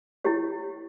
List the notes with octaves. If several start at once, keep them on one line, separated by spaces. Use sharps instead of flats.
E4 G4 C#5